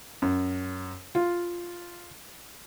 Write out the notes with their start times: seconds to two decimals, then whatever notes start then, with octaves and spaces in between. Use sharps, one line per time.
0.22 F#2
1.15 F4